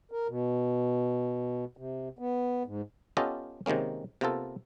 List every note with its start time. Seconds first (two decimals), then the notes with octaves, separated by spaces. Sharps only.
0.11 A#4
0.28 B2
1.77 C3
2.19 B3
2.66 G#2
3.17 B3 C#4 F4 G4 A4 D#5
3.66 C3 D#3 G#3 A#3 C#4
4.21 C3 A#3 B3 F4 A4